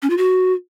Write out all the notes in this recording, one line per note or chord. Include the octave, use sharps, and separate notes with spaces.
C#4
F4
F#4